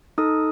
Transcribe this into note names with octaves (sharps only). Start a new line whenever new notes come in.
D#4 A4 D#6